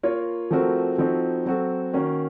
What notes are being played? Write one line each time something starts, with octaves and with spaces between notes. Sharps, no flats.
A#3 F4 A#4 C#5
F3 A3 C4 F#4 A#4
F3 C4 D#4 F#4 A4
F#3 C4 F#4 A4
D#3 A#3 C#4 F#4